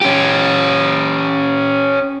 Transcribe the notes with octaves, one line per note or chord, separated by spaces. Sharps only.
C#4 G4